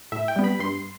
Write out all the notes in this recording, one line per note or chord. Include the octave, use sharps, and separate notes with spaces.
A2 E5
G5
G3 B3
B5
G2 C6